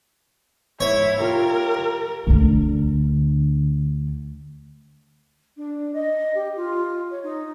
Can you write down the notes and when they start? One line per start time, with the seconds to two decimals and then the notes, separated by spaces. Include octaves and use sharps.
0.81 G#2 E4 C#5
1.20 F4 G4 A#4
2.27 D2 D3
5.57 D4
5.94 D#5
6.35 G4
6.56 F4
7.11 C#5
7.23 D#4